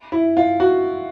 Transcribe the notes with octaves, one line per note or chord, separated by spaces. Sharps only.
E4
F4
F#4